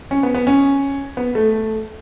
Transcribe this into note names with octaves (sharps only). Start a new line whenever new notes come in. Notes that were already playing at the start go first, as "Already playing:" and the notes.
C#4
B3
B3
C#4
B3
A3